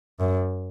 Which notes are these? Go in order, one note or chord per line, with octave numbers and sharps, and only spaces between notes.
F#2